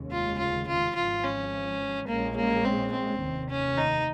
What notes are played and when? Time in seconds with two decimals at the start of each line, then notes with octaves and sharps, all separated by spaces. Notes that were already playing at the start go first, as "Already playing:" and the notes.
Already playing: F1 D#2 C#3 G#3 C#4
0.11 F4
0.38 F4
0.67 F4
0.95 G#1 G#2 F3 F4
1.24 C#4
2.08 A#1 A#2 G#3 A#3 C#4
2.36 A#3
2.65 C4
2.92 C4
3.20 F1 D#2 D#3
3.49 C#4
3.77 D#4